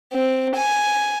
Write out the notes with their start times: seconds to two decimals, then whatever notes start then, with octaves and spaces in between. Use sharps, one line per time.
0.13 C4
0.56 G#5